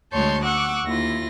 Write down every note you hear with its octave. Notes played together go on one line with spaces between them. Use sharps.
D2 G#3 C#5 A5 C6 G6
F#5 C#6 D6 E6 F#6
D#2 E4 F4 A#6